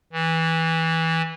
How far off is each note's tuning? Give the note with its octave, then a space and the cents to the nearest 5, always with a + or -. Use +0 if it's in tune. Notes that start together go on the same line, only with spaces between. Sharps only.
E3 -15